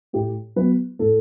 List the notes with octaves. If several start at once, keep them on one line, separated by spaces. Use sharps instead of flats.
A2 G4
F#3 B3 B4
A2 A4